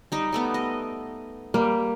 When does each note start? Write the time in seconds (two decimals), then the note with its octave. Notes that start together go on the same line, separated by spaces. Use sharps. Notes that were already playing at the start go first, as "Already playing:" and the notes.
0.12 G3 D#4
0.32 G3 A3 B3
0.54 D#5
1.54 G3 A#3